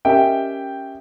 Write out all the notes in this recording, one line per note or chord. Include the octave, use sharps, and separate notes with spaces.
C#4 G4 A#4 D#5 E5 G5